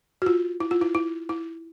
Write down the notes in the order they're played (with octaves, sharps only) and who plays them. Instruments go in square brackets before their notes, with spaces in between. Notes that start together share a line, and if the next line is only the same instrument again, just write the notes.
[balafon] F#4
F4
E4
F4
E4
E4
E4